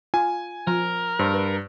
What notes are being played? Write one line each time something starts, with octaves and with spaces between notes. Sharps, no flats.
F4 G#5
F3 A#4
G2 C5
B4